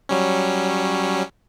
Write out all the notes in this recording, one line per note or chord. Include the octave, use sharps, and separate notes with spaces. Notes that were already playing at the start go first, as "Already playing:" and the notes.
F#3 G3 C#4